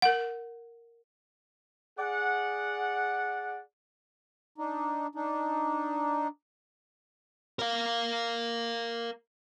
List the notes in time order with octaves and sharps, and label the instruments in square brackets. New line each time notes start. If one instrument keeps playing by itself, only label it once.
[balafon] A#4 F#5
[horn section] G#4 D5 F#5
[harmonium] D4 D#4
D4 D#4
[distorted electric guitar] A#4 F5